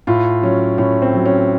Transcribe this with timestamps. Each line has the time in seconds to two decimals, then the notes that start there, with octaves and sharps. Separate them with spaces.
0.07 A2 F4
0.42 F#3 C#4
0.78 A2 C#4
1.02 C4
1.14 F#3
1.26 C#4